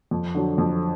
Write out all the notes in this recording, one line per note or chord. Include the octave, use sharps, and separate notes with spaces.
F2
D3 F#3
F2